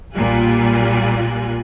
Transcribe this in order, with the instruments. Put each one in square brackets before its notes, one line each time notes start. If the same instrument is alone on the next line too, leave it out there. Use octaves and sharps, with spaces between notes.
[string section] B1 A#2 G3 F4 G#5 F#6